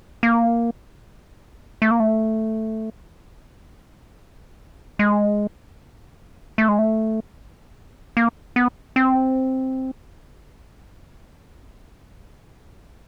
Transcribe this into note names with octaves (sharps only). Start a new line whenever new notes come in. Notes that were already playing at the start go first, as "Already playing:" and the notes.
A#3
A3
A#3
A3
G#3
A3
G#3
A3
A#3
B3
C4